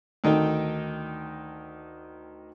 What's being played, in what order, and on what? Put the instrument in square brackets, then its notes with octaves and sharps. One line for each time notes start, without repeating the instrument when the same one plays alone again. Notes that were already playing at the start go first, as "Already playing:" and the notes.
[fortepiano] D2 D#3 D#4 A4 G5